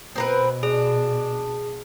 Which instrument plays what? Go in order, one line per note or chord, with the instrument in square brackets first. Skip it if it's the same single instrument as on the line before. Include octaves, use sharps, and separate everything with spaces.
[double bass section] B2 [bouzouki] C4 A#4 B4
[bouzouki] D4 [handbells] G#4